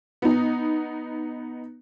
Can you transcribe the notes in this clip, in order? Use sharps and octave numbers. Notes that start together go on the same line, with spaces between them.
B3 D#4